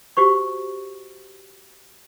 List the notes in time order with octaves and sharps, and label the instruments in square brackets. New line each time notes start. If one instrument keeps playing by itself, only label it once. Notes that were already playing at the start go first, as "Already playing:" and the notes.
[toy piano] F#4 G4 C5 C#6